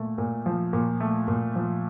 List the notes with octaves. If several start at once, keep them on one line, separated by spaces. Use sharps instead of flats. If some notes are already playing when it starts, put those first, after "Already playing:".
Already playing: A#2 A3
A#2
F3
A#2
A3
A#2
F3